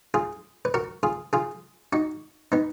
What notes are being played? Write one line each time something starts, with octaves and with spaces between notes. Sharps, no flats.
F4 G#4
B4
F#4 A#4
F4 G#4
F4 G#4
D#4 F#4
B3 D#4